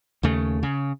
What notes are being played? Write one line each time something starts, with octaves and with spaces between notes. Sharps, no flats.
D#2 C#3 A3
C#3